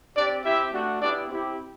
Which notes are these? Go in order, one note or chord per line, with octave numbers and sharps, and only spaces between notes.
C4 D4 G4 D5
C4 E4 G4 E5
A3 D4 F#4
B3 D4 E4 G4 D5
C4 E4 G4